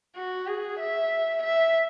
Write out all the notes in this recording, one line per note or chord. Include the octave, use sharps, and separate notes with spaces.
F#4
G#4
E5
E5